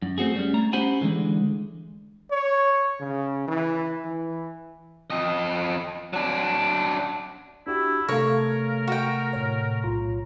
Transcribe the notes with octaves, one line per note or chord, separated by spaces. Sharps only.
F#2
A3 C4 F#4 G#4
G3 C#4
A3 A#5
C#4 G4 C5 F#5 G#5 B5
D3 E3 F3 G#3
C#5
C#3
E3
E3
F2 D#5
F#3 D4
D4 E4 F#4 G4
C3 A3 A4 A#4 C#5 F5
F#4 G5
A2 C#5
B1 F4 A#5